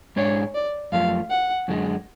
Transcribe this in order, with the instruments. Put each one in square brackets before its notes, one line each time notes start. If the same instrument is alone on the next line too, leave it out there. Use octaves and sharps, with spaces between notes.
[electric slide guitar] G#2 G#3 D4 G#4 [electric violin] C#5
[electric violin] D5
[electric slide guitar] F#2 F3 A3 [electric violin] F5
[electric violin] F#5
[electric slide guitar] F#2 D3 G#3